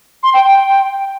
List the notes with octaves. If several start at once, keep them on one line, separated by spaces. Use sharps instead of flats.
C6
G5
G5